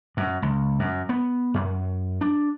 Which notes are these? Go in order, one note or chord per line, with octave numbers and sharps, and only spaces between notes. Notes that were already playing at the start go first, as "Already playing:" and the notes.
F#2
C#2
F#2
B3
F#2
D4